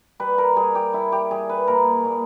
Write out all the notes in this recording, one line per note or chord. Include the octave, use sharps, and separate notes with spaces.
G3 B4
A#4
G3 G#4
G4
G3 E4
G4
G3 G#4
B4
A#2 A#4
A#2